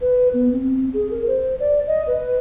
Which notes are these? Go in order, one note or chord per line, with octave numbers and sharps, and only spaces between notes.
B4
B3
C4
G#4
A#4
C5
D5
D#5
B4